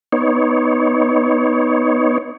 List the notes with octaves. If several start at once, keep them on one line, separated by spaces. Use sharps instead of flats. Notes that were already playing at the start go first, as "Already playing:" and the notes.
B3 D#4 C#5